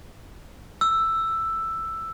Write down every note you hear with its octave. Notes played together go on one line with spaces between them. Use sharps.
E6